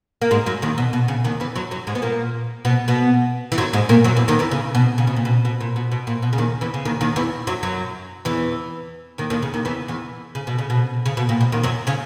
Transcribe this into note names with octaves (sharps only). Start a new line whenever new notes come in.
A#3
G#2 G#3
F#2 F#3
D#2 D#3
B2
B2
C#3
D#2 D#3
E2 E3
F#2 F#3
F#2 F#3
G#2 G#3
B3
A#2 A#3
B2 B3
B2 B3
E3
F#2 F#3
G#2 G#3
A#2 A#3
F#2 F#3
E2 E3
D#2 D#3
E2 E3
C#3
B2
C#3
B2
A#2
B2
B2
A#2
B2
B2
A#2
B2
C#3
D#2 D#3
E2 E3
C#3
D#2 D#3
D#2 D#3
E2 E3
F#2 F#3
F#2 F#3
E2 E3
D#2 D#3
D#2 D#3
C#3
D#2 D#3
E2 E3
E2 E3
C#3
B2
C#3
B2
C#3
B2
A#2
B2
D#2 D#3
F#2 F#3
C#3 C#4